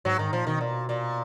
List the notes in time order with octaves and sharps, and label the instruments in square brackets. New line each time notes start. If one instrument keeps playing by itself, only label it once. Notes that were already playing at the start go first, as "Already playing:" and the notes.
[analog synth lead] G#2 [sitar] F#3
[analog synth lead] G#2 [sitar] D#3
[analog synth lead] A#2 [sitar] F3
[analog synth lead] B2 [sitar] D#3
[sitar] A#2
A#2